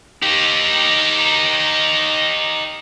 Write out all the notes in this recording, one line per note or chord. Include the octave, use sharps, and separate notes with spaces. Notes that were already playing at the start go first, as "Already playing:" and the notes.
D#4 G4